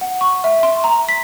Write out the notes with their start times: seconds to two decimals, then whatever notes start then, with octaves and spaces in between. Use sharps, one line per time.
0.01 F#5
0.21 C#6
0.44 E5
0.63 C6
0.84 A#5
1.09 B6